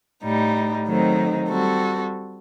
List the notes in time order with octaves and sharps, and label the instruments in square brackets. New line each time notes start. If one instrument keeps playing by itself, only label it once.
[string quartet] A2 G3 D#4
D#3 F#3 A3 C4 D#4
G3 C4 F#4 A4